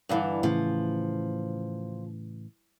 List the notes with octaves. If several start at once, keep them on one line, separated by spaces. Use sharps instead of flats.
G2 D3 E3
A2 C#3 E3 F3